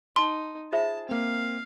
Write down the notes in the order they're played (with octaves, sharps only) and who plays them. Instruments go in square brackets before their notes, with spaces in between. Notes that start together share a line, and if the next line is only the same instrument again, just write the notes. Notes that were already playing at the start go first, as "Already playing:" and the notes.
[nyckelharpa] D#4 [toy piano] A5 [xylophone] C6
[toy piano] F4 C5 E5 [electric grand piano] G#4 [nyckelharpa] A5
[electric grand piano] A#3 C4 [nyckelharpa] F5